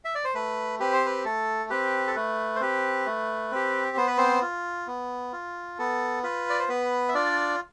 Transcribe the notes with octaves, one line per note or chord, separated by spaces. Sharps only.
E5
D5
C5
A3 B4
C4 G4 B4
C5
B4
A3 A4
C4 G4 B4
A4
A3 B4
C5
C4 G4 B4
A3
C4 G4
B3 C5
B4
C4 C5
F4
B3
F4
B3 A4
F4 B4
D5
C5
B3 B4
E5
D4 F4 D5